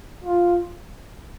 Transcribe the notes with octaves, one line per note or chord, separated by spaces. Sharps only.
F4